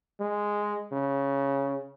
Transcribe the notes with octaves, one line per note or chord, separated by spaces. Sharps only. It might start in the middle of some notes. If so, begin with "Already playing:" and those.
G#3
C#3